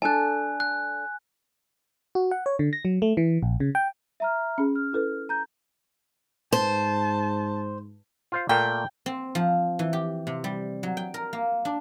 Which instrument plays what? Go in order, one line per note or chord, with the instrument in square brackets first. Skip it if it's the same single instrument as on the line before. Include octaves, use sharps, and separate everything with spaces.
[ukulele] D4 A4 A5 [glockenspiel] G#5 F#6
[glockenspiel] F#6
[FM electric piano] F#4
F#5
C#5
D3
A#6
F#3
A3
E3
A#1
C#3
G5
[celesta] E5 A#5 F6
[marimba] C#4 G#4
[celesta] F6
[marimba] E4 A4 B4
[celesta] A#5 G6
[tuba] G#2 [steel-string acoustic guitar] C5 [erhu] A5
[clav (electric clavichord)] F4 C5 F5
[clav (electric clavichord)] A#2 A3 A#3 [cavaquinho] G5
[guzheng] C4
F3
E3
G4
C3
G3
F#3
G5
A#4
A#3
D4